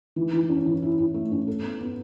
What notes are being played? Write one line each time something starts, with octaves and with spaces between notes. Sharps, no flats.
E3
E3
C#4
E3
E4
E4
A3
C#4
A4
B3
B3